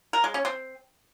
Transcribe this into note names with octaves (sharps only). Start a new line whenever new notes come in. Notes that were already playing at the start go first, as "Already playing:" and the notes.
A#4
G#3
C#4
C4